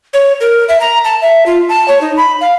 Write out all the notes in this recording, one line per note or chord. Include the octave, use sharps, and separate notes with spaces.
C#5
A#4
E5
A#5
A5
E5
F4
A5
C#5
D#4
B5
F5